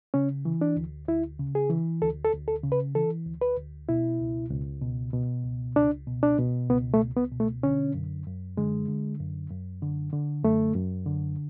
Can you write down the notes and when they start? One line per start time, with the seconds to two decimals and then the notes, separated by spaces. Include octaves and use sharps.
0.14 C#3 C#4
0.45 E3
0.61 D4
0.77 D2
1.08 D2 E4
1.39 C#3
1.55 G#4
1.70 E3
2.02 D2 A4
2.25 A4
2.33 D2
2.48 A4
2.64 C#3
2.72 B4
2.95 E3 A4
3.26 D2
3.41 B4
3.58 D2
3.89 B2 E4
4.20 C#2
4.51 C#2
4.82 B2
5.13 B2
5.45 C#2
5.75 C#2 D4
6.07 B2
6.23 D4
6.39 B2
6.70 C#2 B3
6.94 A3
7.01 C#2
7.16 B3
7.32 B2
7.40 A3
7.63 D3 C#4
7.94 F#2
8.26 F#2
8.57 D3 G#3
8.88 D3
9.19 F#2
9.50 F#2
9.82 D3
10.13 D3
10.44 F#2 A3
10.75 F#2
11.06 D3